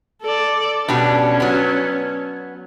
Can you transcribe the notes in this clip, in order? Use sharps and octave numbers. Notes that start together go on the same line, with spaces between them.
A4 D5
B2 G3 C#4 D4
F#3 B3